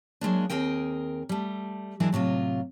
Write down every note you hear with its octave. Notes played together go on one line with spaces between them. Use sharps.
F#3 G#3 A#3 D4
D#2 C4 G#4 A#4 G5
G3 A3
E3 F#3 G#3 D4 E4 A#4
A2 C3 F#3 F4